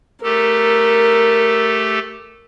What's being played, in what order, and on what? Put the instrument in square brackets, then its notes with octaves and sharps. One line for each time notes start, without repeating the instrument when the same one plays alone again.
[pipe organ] A3 G4 A4 [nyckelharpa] A#4